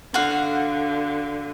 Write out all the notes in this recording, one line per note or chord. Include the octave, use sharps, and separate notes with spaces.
D3 F#4 F5